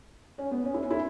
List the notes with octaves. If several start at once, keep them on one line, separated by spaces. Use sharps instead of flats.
C#4
B3
C#4
E4
C#4
E4